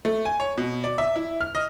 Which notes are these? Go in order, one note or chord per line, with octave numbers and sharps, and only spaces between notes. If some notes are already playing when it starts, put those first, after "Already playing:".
A3
G#5
C#5
B2
D5
E5
E4
F6
D#5